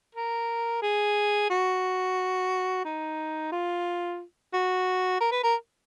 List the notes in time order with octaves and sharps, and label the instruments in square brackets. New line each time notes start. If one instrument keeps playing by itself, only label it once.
[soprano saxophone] A#4
G#4
F#4
D#4
F4
F#4
A#4
B4
A#4